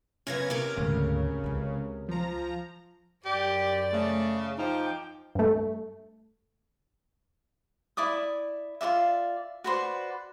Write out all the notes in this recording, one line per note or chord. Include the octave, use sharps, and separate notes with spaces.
F#2 C#3 B3 C#4 G#6 A#6
C3 C#4 A#4 D6
D2 G#2 C#3
C#2 F4
F3 A#5
F#2 G4 D5
C#3 A3
F3 D#4 G5 D6
G2 A3
E4 D5 D6 D#6
F4 F#4 D5 E5
F#4 B4 C5 D5